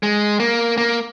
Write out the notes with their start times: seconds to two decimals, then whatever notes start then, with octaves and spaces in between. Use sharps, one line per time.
0.03 G#3
0.40 A#3
0.77 A#3